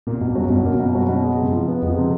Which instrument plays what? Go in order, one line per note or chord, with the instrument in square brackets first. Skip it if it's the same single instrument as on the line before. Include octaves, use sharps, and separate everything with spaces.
[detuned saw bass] A#2 [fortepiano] A#3
[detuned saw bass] F#2 [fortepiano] B2
[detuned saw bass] F#2 [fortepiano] F#3
[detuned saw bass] G2 [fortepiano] B2
[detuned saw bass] F#2 [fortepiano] A#3
[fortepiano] B2
F#3
B2
G#3
C3
F3
B3
[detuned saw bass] F2 [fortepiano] G#3
[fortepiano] C3